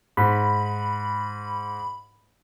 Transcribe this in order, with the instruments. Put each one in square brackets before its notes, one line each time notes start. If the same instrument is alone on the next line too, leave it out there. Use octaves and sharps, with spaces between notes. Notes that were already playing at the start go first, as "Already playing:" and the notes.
[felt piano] G#2 [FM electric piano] B5